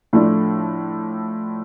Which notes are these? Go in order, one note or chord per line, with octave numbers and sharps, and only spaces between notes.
A2 F3 A3 D4